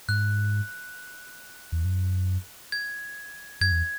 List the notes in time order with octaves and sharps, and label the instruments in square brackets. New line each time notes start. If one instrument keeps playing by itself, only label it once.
[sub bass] G#2 [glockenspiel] F#6
[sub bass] E2
F#2
[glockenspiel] G#6
[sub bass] F#2 [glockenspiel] G#6
[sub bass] E2